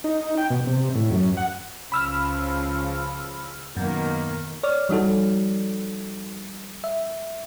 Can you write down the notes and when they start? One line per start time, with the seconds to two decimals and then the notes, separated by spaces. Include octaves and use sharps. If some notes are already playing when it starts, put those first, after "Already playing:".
0.04 D#4
0.38 G5
0.50 B2
0.67 C3
0.95 A2
1.12 F#2
1.37 F#5
1.92 C#2 C#3 F3 B5 E6 F6
3.77 F#2 B2 D#3 A#3
4.63 C#5 D5 F6
4.89 F3 G3 D#4 F#4 A4
6.84 E5